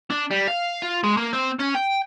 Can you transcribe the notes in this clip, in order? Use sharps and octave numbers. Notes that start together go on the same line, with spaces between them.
D4
G3
F5
F4
G#3
A#3
C4
C#4
G5